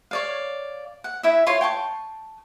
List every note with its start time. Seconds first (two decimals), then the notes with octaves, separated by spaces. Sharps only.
0.11 C#5 D5 F5
1.04 F#5
1.23 E4 E5
1.47 F4 C#5 C6
1.61 G5 A5 C#6